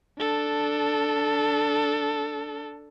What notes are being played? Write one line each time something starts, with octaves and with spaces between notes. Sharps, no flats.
D4 A4